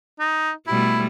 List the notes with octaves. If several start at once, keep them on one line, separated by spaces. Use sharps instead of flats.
D#4
B2 G3 A3 E4